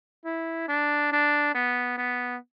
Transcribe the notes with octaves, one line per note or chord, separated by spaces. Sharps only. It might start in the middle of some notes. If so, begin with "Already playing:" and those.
E4
D4
D4
B3
B3